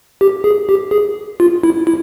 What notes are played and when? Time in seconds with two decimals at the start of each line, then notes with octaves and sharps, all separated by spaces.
0.21 G4
0.44 G#4
0.69 G4
0.91 G#4
1.40 F4
1.63 E4
1.87 E4